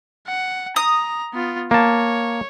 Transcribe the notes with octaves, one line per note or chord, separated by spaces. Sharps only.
F#5
A#5 D#6
B3 F4
A#3 C#5 A5